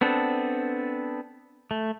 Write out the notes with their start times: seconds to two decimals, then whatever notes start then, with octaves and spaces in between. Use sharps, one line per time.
0.01 B3 C4 D4 A4
1.71 A3